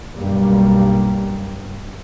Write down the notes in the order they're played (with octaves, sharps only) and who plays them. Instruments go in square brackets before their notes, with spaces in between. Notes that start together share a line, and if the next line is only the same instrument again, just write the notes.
[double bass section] B1 G2 G3 A#3